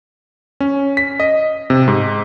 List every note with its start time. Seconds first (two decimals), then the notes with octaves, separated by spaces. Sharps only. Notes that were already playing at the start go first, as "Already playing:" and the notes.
0.60 C#4
0.97 B6
1.20 D#5
1.70 C3
1.88 G#2